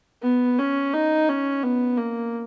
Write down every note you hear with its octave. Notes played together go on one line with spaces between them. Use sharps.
B3
C#4
D#4
C#4
B3
A#3